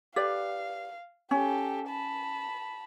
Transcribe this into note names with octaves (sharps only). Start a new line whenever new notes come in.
G4 B4 D5 F5
C#4 G4 A4
A5 B5